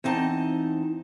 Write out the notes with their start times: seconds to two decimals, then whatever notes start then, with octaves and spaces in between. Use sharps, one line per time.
0.04 E2 C4 D#4 A5